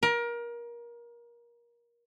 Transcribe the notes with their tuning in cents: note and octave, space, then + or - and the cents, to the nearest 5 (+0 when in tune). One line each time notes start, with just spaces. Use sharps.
A#4 +25